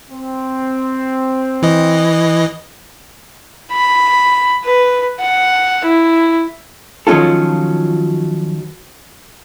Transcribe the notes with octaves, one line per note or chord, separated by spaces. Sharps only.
C4
E3 D#5
B5
B4
F#5
E4
D#3 F3 F#3 C#4 F4 A4